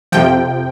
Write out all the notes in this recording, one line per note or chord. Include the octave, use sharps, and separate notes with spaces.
F2 C3 F3 G5